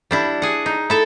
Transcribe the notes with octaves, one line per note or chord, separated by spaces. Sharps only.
G3 D4 E4
G#4 F#5
D#4
E4 A4 E5